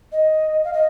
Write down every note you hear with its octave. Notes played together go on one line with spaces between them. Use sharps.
D#5
F5
D#5